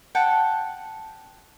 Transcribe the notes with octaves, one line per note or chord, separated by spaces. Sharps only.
F#5 G5 A5